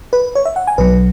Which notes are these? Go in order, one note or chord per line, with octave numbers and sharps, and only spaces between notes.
B4
C#5
E5
F#5
G#5
B1 B2 F#3 B4